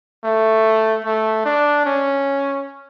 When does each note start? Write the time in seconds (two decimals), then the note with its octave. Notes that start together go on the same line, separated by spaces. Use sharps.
0.24 A3
1.04 A3
1.45 D4
1.86 C#4